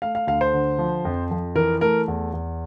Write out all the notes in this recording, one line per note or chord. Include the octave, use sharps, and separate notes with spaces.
A3 F5
F5
D2 F5
C5
D3
F3
F2
F2
E3 A#4
A3 A#4
E2
E2